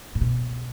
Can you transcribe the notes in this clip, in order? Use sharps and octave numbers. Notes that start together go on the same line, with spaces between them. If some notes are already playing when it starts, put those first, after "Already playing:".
A2
B2